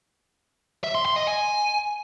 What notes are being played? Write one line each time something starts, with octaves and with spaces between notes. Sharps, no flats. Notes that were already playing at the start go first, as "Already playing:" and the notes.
E5
C6
C6
D#5
G#5